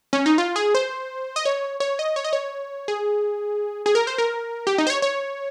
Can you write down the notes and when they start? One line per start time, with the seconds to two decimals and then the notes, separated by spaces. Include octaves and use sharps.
0.13 C#4
0.26 D#4
0.38 F4
0.56 G#4
0.75 C5
1.36 D#5
1.45 C#5
1.80 C#5
1.99 D#5
2.16 C#5
2.24 D#5
2.33 C#5
2.88 G#4
3.86 G#4
3.95 A#4
4.07 C5
4.18 A#4
4.67 G4
4.78 D#4
4.87 C5
4.90 C#5
5.02 C#5